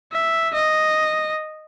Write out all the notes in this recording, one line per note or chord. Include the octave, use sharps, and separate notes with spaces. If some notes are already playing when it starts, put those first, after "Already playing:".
E5
D#5